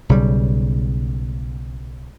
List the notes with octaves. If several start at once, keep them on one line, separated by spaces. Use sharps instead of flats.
B1 C#3 G3